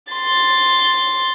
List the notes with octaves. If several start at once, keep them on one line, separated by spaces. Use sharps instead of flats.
C6 A6